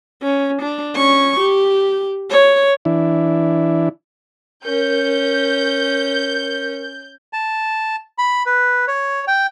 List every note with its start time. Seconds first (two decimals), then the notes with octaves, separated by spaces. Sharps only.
0.22 C#4
0.62 D4
0.95 C#4 C#6
1.39 G4
2.30 C#5
2.85 E3 D4 E4
4.65 C#4 A#4 G6
7.33 A5
8.18 B5
8.46 B4
8.88 C#5
9.28 G5